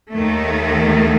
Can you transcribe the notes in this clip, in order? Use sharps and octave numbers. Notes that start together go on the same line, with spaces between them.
D#2 D#3 A3